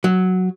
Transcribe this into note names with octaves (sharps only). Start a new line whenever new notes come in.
F#3